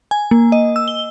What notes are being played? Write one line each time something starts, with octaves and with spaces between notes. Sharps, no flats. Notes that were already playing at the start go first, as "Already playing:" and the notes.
G#5
A#3
D#5
E6
G7